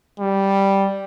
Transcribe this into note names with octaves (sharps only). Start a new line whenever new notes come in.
G3